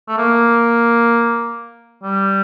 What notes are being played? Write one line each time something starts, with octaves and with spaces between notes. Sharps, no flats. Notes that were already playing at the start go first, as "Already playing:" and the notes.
A3
A#3
G3